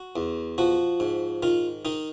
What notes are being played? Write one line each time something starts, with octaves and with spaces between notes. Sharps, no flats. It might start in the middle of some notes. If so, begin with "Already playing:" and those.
Already playing: F#4
E2
F3 F#4
G#2
D#3 F4
D#3 D#4